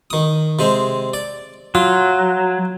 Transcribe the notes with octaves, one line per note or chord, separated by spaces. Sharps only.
D#3 D#6
C3 G#3 C4
D5
F#3 F4